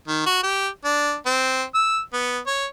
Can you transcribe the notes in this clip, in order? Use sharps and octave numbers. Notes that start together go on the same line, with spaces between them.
D#3
F#4
G4
D4
C4
E6
B3
C#5